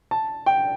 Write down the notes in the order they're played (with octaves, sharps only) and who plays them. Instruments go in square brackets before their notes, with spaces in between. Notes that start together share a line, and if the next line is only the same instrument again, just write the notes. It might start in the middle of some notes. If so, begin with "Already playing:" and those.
[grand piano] A5
G5